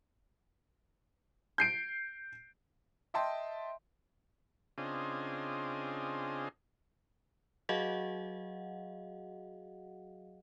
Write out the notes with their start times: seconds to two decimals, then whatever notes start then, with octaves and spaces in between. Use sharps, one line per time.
1.58 G6 C7 D7
3.14 D#5 E5 G5 A5 C6
4.78 C#3 C4 D4 F4 G#4 D#5
7.69 F#3 F#4 G#4 D#5 F5 F#5